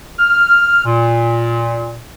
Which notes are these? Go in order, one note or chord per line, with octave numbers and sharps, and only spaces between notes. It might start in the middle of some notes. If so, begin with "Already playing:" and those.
F6
A#2